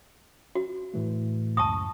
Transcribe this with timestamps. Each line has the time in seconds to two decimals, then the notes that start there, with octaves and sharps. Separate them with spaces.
0.55 F#4
0.94 A2 E3 A3
1.57 C#2 F#2 A5 C#6 D#6